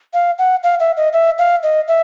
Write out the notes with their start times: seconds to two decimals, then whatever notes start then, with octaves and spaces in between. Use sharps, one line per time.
0.14 F5
0.38 F#5
0.63 F5
0.80 E5
0.97 D#5
1.13 E5
1.38 F5
1.63 D#5
1.88 E5